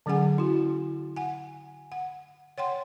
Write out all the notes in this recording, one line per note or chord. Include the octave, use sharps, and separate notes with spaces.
D3 F#3 C#4 G#4 F#5 G#5
E4 F#4
F#5 G#5
F#5
C#5 F#5 G5 C6